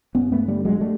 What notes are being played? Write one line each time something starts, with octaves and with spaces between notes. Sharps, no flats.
G2 B3 C#4
A3 B3
D3 G3 A3
F#3 G#3
G3 A3